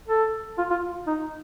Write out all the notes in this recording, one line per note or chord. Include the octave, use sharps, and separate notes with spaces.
A4
F4
F4
D#4